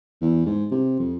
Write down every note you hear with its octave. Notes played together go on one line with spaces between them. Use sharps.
E2
G#2
C3
F2